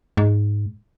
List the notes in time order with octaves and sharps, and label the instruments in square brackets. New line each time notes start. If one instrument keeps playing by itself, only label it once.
[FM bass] G#2